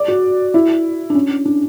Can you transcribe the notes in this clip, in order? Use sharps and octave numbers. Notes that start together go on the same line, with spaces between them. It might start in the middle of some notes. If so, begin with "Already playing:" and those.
Already playing: D5
F#4
E4
D4
C#4
D4